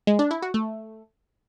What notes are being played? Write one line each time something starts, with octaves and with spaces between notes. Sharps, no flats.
G#3
D4
E4
F#4
A3